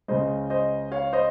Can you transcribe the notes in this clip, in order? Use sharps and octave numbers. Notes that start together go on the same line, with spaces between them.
C#2 C#3 G#3 C5 D#5
C5 D#5
C#5 F5
C5 D#5